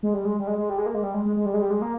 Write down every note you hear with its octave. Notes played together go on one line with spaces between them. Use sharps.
G#3
G3
G#3
G3
G#3
G#3
G3
G#3
A#3
G#3
G3
G#3
G#3
G#3
G3
G#3
G3
G#3
A#3